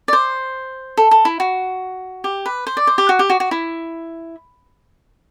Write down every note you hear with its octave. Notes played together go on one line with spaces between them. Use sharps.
D5
C5
A4
A4
E4
F#4
G4
B4
C5
D5
C5
G4
F#4
G4
F#4
F#4
E4